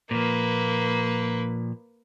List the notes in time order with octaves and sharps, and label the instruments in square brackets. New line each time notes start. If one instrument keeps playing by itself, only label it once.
[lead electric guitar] A#2 F3 [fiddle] A#3 B4